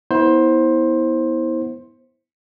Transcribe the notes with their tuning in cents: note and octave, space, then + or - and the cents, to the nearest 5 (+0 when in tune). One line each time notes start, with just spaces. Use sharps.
B3 -10 E4 -30 C5 +15